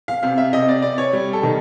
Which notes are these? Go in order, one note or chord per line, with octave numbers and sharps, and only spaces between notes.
F5
C3 F5
E5
C3 D#5
D5
C3 D5
C#5
G3
A4
D#3